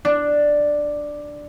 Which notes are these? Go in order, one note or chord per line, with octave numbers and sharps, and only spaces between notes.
D4